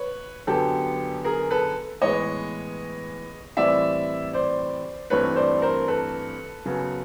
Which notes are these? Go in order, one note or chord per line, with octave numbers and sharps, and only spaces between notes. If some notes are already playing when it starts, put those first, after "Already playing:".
Already playing: B4 C#5
F#2 D3 F#3 B3 G4 A4
G#4 A#4
A4 B4
A2 E3 G#3 B3 C#5 D#5
A2 E3 G3 C4 D5 E5
C5 D5
G2 E3 A3 C4 B4 C#5
C5 D5
A#4 C5
A4 B4
F#2 C#3 F#3 B3